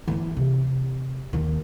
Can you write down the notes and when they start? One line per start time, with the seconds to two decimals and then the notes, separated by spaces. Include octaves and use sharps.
0.08 E3 B3
0.37 C3
1.33 D#2 D#3